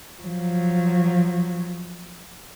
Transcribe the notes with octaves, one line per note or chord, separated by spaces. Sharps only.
F3 F#3